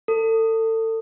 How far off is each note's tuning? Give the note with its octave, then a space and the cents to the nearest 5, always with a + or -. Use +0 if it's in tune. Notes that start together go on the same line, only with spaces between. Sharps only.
A4 +30